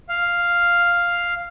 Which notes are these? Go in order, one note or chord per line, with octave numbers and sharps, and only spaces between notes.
F5